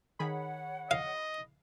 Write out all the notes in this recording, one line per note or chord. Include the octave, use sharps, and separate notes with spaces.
D#3 G#4 C#5 F#5 B5
D#5 F5